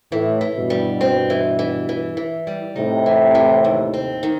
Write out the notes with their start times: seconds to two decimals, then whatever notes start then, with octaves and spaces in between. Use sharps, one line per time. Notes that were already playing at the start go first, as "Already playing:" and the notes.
0.12 A2 E3
0.41 E3
0.56 G2 B2
0.70 G3
1.01 C4
1.30 E3
1.59 E3
1.89 E3
2.17 E3
2.47 G3
2.76 A2 C3 D#4
3.06 E3
3.35 E3
3.65 D#2
3.94 C4
4.23 D#3